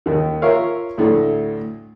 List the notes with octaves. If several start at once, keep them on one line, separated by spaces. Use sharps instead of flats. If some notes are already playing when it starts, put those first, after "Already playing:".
D#2 D#3
F4 A#4 C#5 E5 F5
D2 A2 A3